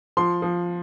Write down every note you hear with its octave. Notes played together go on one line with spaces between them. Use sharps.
F3 C6
F3